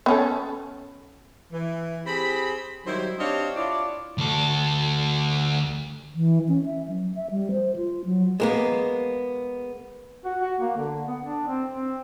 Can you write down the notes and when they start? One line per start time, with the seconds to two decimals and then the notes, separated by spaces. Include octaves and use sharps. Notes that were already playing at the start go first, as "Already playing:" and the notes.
0.06 B3 C#4 A4
1.52 E3
2.06 C4 G4 G#4 B5
2.86 D#3 F#3 G3 E4 C5
3.18 C4 D4 G4 C#5 D#5 F5
3.55 D4 E4 F4 C#5 D5
4.18 D2 A4
6.15 E3
6.49 C#4
6.66 E5
6.88 F#3
7.15 E5
7.31 G3
7.51 C5
7.76 F4
8.05 F#3
8.40 G#3 A#3 B3
10.25 F#4
10.40 F#4
10.61 A#3
10.77 D3
11.08 B3
11.23 D4
11.48 C4
11.70 C4